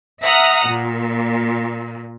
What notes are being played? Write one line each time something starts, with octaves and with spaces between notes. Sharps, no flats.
E5 F#5 A#5 D#6 F6
A#2